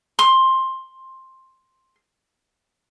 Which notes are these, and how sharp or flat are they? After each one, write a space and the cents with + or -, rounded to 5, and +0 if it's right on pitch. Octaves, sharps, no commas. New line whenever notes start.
C6 +10